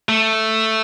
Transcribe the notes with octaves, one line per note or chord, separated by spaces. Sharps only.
A3